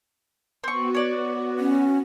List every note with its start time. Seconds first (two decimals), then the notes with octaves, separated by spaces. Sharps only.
0.64 B3 C4 F#4 C#6
0.94 C#5 D5
1.59 C#4